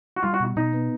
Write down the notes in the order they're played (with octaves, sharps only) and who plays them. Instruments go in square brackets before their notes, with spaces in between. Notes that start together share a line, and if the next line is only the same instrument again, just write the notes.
[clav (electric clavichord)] F#4
[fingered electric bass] G3 [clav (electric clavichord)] F4
[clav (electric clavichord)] F#4
[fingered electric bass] B2
[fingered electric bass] B2 [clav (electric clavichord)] D#4
[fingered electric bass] B3